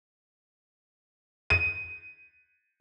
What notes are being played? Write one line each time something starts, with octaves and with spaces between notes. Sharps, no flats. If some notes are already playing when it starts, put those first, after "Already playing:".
D#7